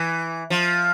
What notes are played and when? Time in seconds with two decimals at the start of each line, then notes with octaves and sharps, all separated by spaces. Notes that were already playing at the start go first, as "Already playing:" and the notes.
Already playing: E3
0.50 F3